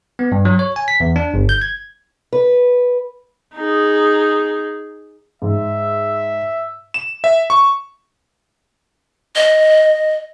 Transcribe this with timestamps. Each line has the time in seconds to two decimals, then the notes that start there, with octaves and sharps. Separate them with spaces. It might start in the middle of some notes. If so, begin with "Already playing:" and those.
0.19 B3
0.32 G2
0.45 F#3
0.59 C#5
0.76 G#5
0.88 B6
1.00 E2
1.16 D4
1.34 G1
1.49 G6
1.62 G#6
2.33 B4
3.56 D#4 G#4
5.42 G#2 E5
6.94 E7
7.24 E5
7.50 C#6
9.36 D#5